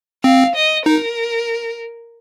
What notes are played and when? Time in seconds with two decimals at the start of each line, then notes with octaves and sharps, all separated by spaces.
0.24 C4 F5
0.55 D#5
0.86 D#4 A#4